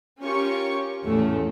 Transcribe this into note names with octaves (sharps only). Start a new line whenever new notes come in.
C#4 F4 G4 A#4 C#6
G#1 E2 A2 A3 C#4